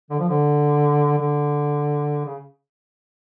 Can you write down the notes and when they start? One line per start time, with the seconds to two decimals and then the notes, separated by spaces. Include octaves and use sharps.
0.10 D3
0.19 F3
0.29 D3
1.18 D3
2.25 C#3